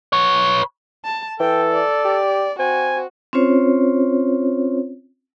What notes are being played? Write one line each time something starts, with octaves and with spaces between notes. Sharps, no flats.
B4 C#5
A5
E3 A4 G5
D5
G4
C4 F#4 G#5
C4 C#4 F4 C5 C#5